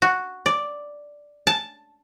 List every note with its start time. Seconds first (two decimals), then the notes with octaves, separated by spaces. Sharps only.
0.02 F#4
0.46 D5
1.47 A5